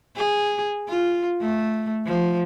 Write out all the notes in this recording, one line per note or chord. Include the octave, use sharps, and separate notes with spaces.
G#4
F4
A3
F3